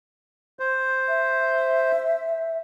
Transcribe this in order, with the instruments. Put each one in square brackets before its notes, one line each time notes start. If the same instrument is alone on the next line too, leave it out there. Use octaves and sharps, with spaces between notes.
[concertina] C5
[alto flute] E5